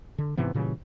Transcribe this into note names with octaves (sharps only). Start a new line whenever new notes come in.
D3
G#2 C3 E3 B3
A#2 C#3 E3 G3